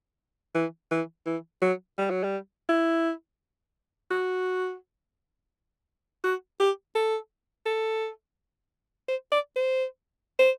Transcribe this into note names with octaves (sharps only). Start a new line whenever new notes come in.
E3
E3
E3
F#3
G3
F#3
G3
E4
F#4
F#4
G4
A4
A4
C5
D5
C5
C5